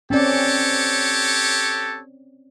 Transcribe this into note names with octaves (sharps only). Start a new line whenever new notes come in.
C4 C#4 G4 A4 C#5 D5